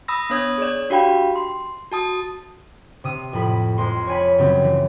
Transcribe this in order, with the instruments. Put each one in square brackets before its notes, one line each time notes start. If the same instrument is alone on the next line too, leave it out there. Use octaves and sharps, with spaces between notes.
[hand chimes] B5 D#6 E6 A#6
B3 D4 C#5 D#6 G#6
G#4 C#5 D5
D4 F#4 G4 F5 G5 B5
C6
F#4 A5 D#6
[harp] C3 D#6
F2 A2 B5
F2 G#3 C6
C#5 G#5 B5
F#2 C#3 B3 C4
E3